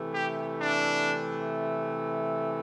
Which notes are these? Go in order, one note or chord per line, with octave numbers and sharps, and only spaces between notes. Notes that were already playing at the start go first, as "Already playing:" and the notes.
Already playing: C3 E3 A3
G4
D4